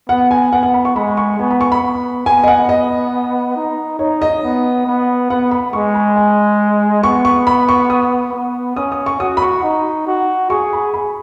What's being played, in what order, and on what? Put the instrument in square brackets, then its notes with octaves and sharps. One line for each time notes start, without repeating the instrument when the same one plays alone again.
[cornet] B3 [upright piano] F#5
[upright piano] G#5
[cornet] B3 [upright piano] F#5
[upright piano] F#5
B5
C#6
[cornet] G#3 [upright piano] B5
[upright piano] C#6
[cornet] B3 [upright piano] G#5
[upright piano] B5
C#6
B5
[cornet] B3
[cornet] B3 [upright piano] G#5
[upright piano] D#5
F#5
D#5
[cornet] D#4
[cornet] D#4 [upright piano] C#5
[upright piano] D#5
[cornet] B3
B3
[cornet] B3 [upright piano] F#5
[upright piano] B5
[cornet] G#3 [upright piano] C#6
[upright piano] B5
G#5
[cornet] B3 [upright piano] C#6
[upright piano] C#6
B5
C#6
D#6
[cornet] B3
[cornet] C#4 [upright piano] D#6
[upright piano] D#6
C#6
[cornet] F#4 [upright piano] D#6
[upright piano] B5
C#6
[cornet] D#4
F#4
[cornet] G#4 [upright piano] C#6
[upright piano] B5
B5